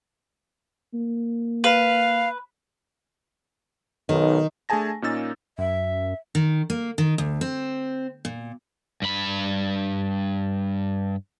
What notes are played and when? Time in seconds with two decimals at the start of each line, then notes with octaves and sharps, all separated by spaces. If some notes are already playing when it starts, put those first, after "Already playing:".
0.94 A#3
1.64 B4 F5
4.09 B1 D#3
4.69 A3 D4 G#4 G#5 A5 A#6
5.02 A#2 A#3 C#4 D#4 E6 A6
5.58 F#2 E5
6.35 D#3
6.70 A#3
6.98 D#3
7.18 D2
7.41 C4
8.25 A#2
9.02 G2 B5